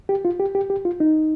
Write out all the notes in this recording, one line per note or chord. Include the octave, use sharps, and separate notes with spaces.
G4
F4
G4
G4
G4
F4
D#4